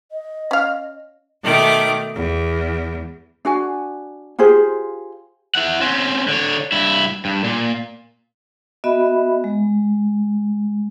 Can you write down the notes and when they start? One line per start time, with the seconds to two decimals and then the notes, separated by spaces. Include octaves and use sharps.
0.11 D#5
0.51 C#4 F5
1.43 B2 D#3 A3 D6
2.15 E2
3.45 D4 F#4 G#5
4.39 F4 G4 G#4 C5
5.55 E4 F#5
5.81 C4 C#4
6.28 D3 C#5
6.72 G2 E4
7.25 G2
7.44 A#2
8.84 B3 F#4 D#5 E5 B5
9.44 G#3